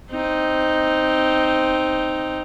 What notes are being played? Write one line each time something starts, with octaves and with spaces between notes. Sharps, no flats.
C4 D#4